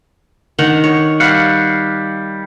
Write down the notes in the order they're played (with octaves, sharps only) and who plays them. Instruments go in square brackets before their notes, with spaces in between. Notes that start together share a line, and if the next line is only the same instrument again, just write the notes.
[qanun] D#3 D4 F#5
C#5
[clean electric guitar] G3 F5 F#5